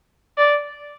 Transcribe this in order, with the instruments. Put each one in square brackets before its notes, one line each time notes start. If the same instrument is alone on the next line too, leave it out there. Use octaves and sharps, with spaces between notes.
[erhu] D5